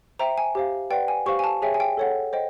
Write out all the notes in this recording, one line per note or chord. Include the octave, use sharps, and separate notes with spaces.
C5 E5 G5 A#5
G#5
G4 C5 F5
B4 D5 F#5 G5
G#5
G4 C5 F5 C#6
G#5
A5
G#4 C#5 E5 G5 G#5
G#5
G5
A4 C#5 F#5
C5 D#5 G5